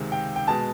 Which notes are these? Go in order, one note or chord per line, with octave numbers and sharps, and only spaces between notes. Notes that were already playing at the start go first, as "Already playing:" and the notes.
Already playing: C#2 C3 D#3 G#3
G5
G5
B2 G#3 A5